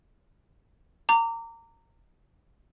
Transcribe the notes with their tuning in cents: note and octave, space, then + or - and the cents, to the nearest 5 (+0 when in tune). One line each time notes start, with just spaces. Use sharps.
A#5 -25 D6 -15